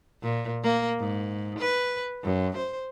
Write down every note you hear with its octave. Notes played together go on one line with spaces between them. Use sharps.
A#2
A#3
G#2
B4
F#2
C5